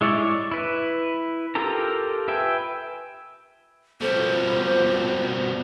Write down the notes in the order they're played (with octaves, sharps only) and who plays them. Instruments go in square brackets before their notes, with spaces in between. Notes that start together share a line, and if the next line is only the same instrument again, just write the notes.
[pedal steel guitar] G#3 E4 C#5 D5 E5
E4 B4
F4 G4 A4 A#4 A#5
B4 E5 G5 G#5
[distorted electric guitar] B2 G3 [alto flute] A4 [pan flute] C5
[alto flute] F4